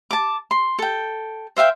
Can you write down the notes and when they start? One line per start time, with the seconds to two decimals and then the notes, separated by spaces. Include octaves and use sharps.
0.11 A5 D6
0.51 C6
0.79 A4 G5
1.57 C5 E5 F5 G5